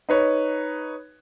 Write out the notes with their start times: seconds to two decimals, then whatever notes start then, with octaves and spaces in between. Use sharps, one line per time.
0.09 D#4 B4 C#5